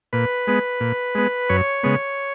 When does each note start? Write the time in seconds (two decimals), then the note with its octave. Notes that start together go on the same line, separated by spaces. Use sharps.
0.13 A#2 B4
0.47 G#3 B3
0.80 A#2
1.15 G#3 B3
1.49 F#2 C#5
1.83 C#3 G#3 B3